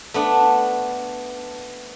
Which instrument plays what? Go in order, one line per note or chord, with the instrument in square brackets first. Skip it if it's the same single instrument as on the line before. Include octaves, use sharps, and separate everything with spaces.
[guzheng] A3 B3 D4